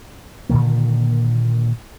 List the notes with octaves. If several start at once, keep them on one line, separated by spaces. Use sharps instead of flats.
A#2 D3 D#3 A#3